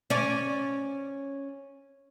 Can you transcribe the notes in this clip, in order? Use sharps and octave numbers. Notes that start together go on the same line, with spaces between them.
C#4 D5